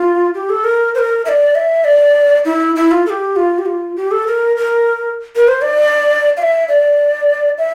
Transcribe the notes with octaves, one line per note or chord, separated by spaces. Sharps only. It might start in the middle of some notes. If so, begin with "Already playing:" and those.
Already playing: F4
G4
A4
A#4
C5
A#4
E5
D5
E5
D5
E4
E4
F4
A4
G4
F4
G4
F4
G4
A4
A#4
A#4
A#4
C5
D5
F5
E5
D5
E5